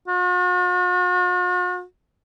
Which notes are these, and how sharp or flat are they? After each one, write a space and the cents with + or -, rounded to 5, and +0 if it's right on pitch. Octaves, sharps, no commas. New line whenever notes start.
F#4 -45